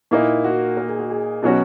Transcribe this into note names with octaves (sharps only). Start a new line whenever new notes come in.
A#2 A#3 D#4 E4
F#4
A#4
G#4
F#4
G#4
B2 F#3 C#4 F#4 D#5